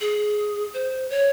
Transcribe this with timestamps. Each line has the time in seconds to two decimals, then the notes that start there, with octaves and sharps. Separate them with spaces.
0.01 G#4
0.74 C5
1.10 C#5